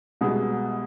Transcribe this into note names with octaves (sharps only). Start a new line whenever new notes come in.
C2 B2 G#3 B3